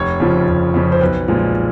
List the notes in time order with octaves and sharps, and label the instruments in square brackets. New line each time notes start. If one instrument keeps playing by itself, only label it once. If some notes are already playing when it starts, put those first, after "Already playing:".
Already playing: [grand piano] F1 C#5
F2 C#3 F3
F1
F2 C#3 F3
C5
B1 B4
A#2 F3 G#3